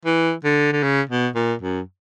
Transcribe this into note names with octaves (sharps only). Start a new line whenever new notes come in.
E3
D3
D3
C#3
B2
A#2
F#2